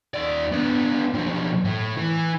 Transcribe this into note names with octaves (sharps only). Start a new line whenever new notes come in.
D#2 D5
B3 D4
B1 F3
A2
E3